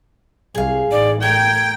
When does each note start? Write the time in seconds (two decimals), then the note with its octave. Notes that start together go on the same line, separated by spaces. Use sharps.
0.55 C2 G#4 F5
0.91 A1 D#4 D5
1.23 A3 A#4 G5 G#6